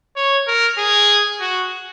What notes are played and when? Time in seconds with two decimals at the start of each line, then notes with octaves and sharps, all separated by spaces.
0.16 C#5
0.47 A#4
0.78 G#4
1.40 F#4